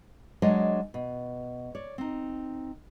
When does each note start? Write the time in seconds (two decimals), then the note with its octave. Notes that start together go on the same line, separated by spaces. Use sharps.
0.42 F#3 G#3 D4 C#5 D#5
0.94 B2
1.75 C#5 D5
1.98 C4 D#4